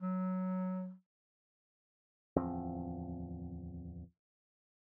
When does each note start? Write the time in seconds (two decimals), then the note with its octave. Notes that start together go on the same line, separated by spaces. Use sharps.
0.01 F#3
2.36 D1 E2 F3 C4